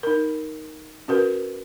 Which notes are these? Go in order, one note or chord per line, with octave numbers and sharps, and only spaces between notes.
D#4 A#4
C#4 F#4 A#4 B4